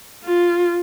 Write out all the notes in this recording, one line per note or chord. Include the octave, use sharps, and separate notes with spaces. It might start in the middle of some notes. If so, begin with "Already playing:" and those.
F4